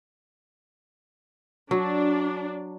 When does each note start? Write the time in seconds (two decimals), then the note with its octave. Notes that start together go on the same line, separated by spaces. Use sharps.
1.71 F#3 D4